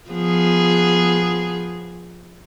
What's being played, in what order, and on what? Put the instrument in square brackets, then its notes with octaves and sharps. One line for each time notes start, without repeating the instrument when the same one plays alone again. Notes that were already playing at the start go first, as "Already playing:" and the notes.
[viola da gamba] F3 B3 G#4